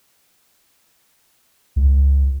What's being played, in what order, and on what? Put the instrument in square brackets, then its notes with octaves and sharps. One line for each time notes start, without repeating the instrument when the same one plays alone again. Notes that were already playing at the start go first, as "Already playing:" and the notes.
[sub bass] C#2